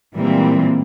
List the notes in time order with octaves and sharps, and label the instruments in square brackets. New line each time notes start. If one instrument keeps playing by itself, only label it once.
[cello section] A#2 E3 G3 G#3 A#3 C4